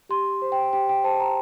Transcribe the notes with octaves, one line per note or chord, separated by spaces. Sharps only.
G4 C6
C5
G5
G4 G5
G5
C5 A5
A#5